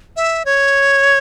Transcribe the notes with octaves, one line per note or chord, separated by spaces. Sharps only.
E5
C#5